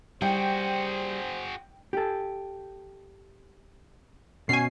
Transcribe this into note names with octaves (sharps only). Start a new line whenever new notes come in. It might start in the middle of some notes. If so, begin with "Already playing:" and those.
G3 F#4 G#4 C5 G5
G4 A4
B2 C#4 G#5 C7